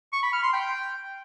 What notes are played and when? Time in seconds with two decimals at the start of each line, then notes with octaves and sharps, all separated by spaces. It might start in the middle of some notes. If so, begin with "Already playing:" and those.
0.13 C#6
0.23 B5
0.33 F6
0.43 C6
0.53 G5